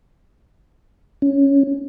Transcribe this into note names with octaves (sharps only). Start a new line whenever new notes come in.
C#4